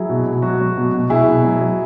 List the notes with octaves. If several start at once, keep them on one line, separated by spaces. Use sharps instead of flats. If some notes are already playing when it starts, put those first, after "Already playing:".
Already playing: F#3 E4 G#4
B2
B2
F#3 F#4
F#3
B2
B2
B2 E4 G#4
B2
F#3
F#3